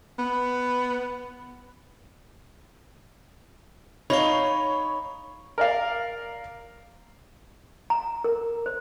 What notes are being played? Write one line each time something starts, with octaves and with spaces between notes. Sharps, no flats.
B3
D#4 C#5 D#5 F5 B5 C#6
A#4 D5 F5
A#5
A#4
C5